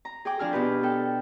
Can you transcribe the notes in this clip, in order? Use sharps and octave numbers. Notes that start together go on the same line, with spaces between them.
A#5
G#4 G5 D6
F3 D4 G#4 F6
B2 G4 B4 G6
A4 G5